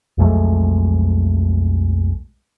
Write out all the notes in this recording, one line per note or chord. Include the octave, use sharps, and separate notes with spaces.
B1 F2 G#3 A3